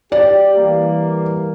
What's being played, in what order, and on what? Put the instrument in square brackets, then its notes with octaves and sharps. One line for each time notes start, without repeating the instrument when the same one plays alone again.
[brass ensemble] G4 [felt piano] D5
[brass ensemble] E3 G3 A#3